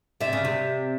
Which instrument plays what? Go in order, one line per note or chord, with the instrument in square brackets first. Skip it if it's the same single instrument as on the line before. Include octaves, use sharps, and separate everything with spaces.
[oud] C3 [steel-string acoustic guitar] D5 E5
[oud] C#3
C3